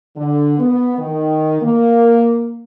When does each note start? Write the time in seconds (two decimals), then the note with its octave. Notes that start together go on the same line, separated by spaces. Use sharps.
0.16 D3
0.59 B3
0.98 D#3
1.61 A#3